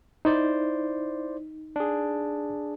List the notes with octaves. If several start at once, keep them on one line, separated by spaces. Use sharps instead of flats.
D#4 E4 C5 D5
D4 G#4